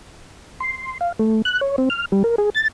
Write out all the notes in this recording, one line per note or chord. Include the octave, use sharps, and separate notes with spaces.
C6
F5
A3
F#6
C#5
C4
F6
G3
A#4
G#4
A6